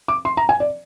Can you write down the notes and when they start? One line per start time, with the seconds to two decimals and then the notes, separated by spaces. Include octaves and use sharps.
0.08 D6
0.25 C6
0.37 A#5
0.49 G#5
0.60 D5